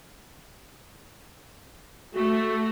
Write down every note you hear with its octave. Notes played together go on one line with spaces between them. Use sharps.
A3 F#4